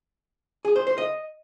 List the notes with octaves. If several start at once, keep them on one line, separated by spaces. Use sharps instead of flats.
G#4
C5
C5
D#5